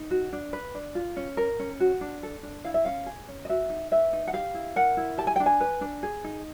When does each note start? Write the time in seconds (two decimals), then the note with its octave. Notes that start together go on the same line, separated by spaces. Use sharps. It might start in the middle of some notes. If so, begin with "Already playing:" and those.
Already playing: D#4
0.11 F#4
0.33 D4
0.53 B4
0.75 D4
0.95 F4
1.16 C#4
1.37 A#4
1.59 C#4
1.80 F#4
2.01 D4
2.23 A4
2.43 D4
2.64 E4 F5
2.74 E5
2.85 C#4 F5
3.06 G#4
3.28 C#4
3.45 D#5
3.49 F#4 E5
3.70 D#4
3.91 B4 E5
4.13 D#4
4.28 F#5
4.33 G4 F5
4.54 E4
4.76 A#4 F#5
4.97 E4
5.18 G4 A5
5.27 G#5
5.36 G5
5.40 D4
5.46 G#5
5.60 B4
5.81 D4
6.03 G#4
6.24 D#4